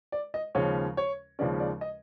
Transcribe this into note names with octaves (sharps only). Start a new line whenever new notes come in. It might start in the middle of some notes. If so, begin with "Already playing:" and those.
D5
D#5
D#2 C#3 F3 G#3 C#4 C#5
C#5
D#2 C#3 F3 G#3 C#4 D5
D5
D#5